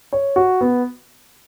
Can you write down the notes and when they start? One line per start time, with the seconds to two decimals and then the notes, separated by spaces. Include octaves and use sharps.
0.13 C#5
0.36 F#4
0.61 B3